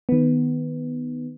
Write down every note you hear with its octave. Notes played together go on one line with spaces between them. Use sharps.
D#3 B3